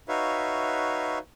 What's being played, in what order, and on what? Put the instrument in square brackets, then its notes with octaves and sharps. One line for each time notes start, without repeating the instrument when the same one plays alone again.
[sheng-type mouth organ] D#4 F#4 B4 C#5 E5 F5